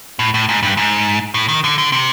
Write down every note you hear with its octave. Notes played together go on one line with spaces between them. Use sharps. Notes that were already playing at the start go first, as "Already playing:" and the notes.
A2
A2
G#2
G2
G#2
A2
D#3
D3
D3
C3